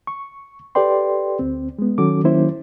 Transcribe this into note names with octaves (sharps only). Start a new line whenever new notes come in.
C#6
G4 A4 B4 D5 G5 C6
D2 C4
G#3 B3
D#3 F#3 C#4 F#4 A4 D6
D#3 F#3 A#3 C#4 E4 C5